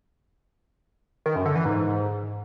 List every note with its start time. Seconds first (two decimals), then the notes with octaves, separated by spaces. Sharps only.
1.26 D#3
1.36 F#2
1.46 D3
1.55 E3
1.65 G#2